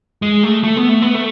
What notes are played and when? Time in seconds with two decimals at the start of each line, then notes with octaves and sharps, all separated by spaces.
0.22 G#3
0.43 A3
0.64 A3
0.77 B3
0.89 A3
1.02 B3
1.14 A3